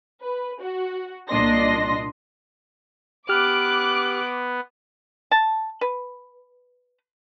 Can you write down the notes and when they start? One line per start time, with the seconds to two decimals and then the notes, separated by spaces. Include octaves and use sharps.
0.21 B4
0.61 F#4
1.28 C2 A#2 D4 D#5 C6 A#6
3.29 B3 G4 D6 F6 F#6
5.31 A5
5.81 B4